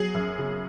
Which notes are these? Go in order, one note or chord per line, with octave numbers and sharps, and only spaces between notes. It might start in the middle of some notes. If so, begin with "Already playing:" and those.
Already playing: F#3 G#4
F#2
C#3